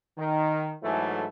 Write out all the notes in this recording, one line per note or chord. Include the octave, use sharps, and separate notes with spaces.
D#3
G#2 E3 F#3 A3 E4 A4